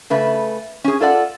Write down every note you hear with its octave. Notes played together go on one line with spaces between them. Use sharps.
C#3 A3 B4
C#4 G#4
F4 A4 D5 F#5